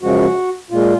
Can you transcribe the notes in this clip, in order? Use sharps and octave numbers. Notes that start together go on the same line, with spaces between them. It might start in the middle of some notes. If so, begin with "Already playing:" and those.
F#2 C#3 F3 G#3 F#4
A#2 G#3 F4